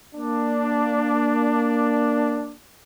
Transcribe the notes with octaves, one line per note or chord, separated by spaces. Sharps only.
A#3 D4